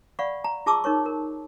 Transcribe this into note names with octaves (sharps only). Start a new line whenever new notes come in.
D5 F5 F#5 B5 C#6
A#5
F4 G#4 A5 C#6 D6 E6
D#4 A#4 C#5 C#6
A#4